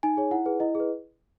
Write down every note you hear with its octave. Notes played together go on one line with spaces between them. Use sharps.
D#4 G#5
G#4 C#5
E4 F#5
G#4 B4
E4 D#5
G#4
B4